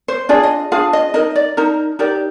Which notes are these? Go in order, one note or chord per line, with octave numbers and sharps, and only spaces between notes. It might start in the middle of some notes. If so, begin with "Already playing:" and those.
C5
D4 F4 G#4 D5
D#5
D4 F4 G#4 F5
D#5
D#4 A#4 D#5
D5
D#4 A#4
D#4 G4 A#4 D5